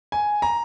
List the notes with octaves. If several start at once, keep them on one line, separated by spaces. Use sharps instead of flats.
G#5
A#5